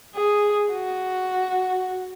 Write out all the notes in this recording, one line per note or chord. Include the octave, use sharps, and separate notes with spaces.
G#4
F#4